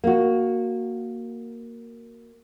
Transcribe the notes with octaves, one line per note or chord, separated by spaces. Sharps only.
A#3 F#4